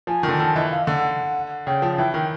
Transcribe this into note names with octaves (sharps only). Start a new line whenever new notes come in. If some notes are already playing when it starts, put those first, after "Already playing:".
F3 G#5
D#3
D3
D#3 A5
E3 D#5
F5
D3 F#5
C#3 G5
F3
E3 G5
D#3 G5